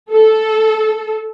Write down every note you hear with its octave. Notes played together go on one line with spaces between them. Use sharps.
A4